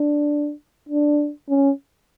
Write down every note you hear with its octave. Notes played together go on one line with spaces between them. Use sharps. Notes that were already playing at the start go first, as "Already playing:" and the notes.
Already playing: D4
D4
C#4